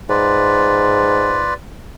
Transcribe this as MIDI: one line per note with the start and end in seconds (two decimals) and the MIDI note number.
0.09 1.49 44
0.09 1.54 65
0.09 1.54 71
0.09 1.54 74